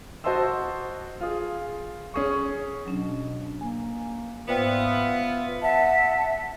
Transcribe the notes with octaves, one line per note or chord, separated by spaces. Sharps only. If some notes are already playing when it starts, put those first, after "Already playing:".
F#4 C5 D#5 A5 C6 E6
F4 G#4
C#4 G#4 C#6
B2 F#3 C#4 D4
A#3 G#5
G#2 B3 F4 C5 D5 E5 G5
E5 F#5 A5